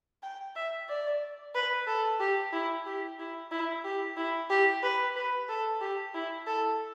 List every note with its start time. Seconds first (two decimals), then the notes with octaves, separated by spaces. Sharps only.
0.23 G5
0.56 E5
0.89 D5
1.55 B4
1.87 A4
2.20 G4
2.53 E4
2.86 G4
3.19 E4
3.51 E4
3.84 G4
4.17 E4
4.50 G4
4.83 B4
5.16 B4
5.49 A4
5.81 G4
6.14 E4
6.47 A4